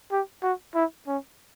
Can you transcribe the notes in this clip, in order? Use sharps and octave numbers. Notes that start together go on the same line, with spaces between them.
G4
F#4
E4
C#4